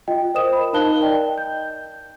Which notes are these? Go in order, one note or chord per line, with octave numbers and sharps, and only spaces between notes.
F4 D#5 G5
A#4 C5 D#5 D#6 E7
B5
D#4 A#4 F5 A5 F#6 G7
D5 D#5 G5
G6